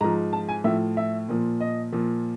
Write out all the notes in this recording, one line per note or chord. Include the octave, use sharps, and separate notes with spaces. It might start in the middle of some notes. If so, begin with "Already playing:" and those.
G#2 F3 A#5
A5
G#5
A2 F3 E5
E5
A#2 F3
D#5
A#2 F3